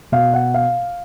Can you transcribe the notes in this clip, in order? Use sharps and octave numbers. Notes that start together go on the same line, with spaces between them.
B2 F5
F#5
F5